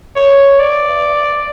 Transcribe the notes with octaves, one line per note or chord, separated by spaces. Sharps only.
C#5
D5